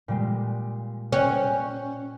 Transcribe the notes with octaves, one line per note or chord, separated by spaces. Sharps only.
A#2 G3 G#3
C#4 G5 F#6